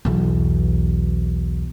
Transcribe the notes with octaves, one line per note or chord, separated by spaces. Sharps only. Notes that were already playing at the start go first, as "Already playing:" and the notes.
B1 E2